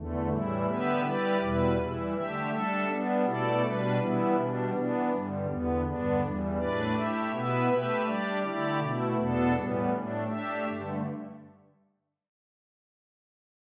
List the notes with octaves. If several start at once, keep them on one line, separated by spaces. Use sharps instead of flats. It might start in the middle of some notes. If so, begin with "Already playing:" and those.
Already playing: E2 D3 A3
A2 E3 G3 E4
D3 B3 G4 B4 E5
G3 E4 G4 B4 D5
E2 B2 G3 E4 B4
E3 G3 E4
D3 A3 G4 E5
G3 D4 A4 E5
G3 B3 D4
B2 A3 E4 A4 D5
B2 G3 D4 B4
E3 G3 B3 E4
B2 G3 D4
E3 B3 D4
G2 D3 G3
E2 D3 B3
G2 D3 B3 D4
E2 E3 G3
A2 A3 D4 B4 D5
A3 E4 G4 E5
B2 B3 E4 B4 E5
A3 G4 B4 E5
G3 D4 G4 D5
D3 A3 E4 G4 D5
B2 A3 E4
E2 B2 B3 D4 A4
A2 E3 G3 B3
A2 A3 D4
A3 D4 G4 E5
G2 D3 A3